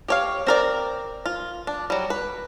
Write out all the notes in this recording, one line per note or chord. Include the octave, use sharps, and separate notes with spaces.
G4 C#5 F5
C4 A#4 D5
F4
D4
F#3 G3
B4